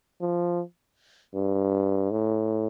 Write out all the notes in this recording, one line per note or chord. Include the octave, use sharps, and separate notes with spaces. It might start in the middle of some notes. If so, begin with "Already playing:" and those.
F3
G2
A2